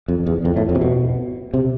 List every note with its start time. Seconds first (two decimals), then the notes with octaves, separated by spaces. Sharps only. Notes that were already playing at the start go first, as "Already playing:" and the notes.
0.08 F2
0.26 E2
0.45 F2
0.57 A2
0.69 F2
0.75 C3
0.81 B2
1.54 C3